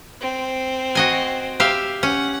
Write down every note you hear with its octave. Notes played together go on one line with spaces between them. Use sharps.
C4
F#4 D#5 G#5
G4 E5 F5
C#4 F#5